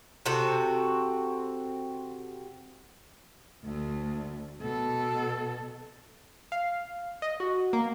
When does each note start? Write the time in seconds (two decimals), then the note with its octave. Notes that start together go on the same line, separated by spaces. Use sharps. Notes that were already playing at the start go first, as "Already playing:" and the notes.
0.26 C3 C4 F#4 A4
3.64 D2 A3
4.61 B2 A4
6.52 F5
7.22 D#5
7.40 F#4
7.73 A#3